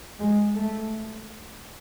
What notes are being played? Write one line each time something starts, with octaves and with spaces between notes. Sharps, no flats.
G#3
A3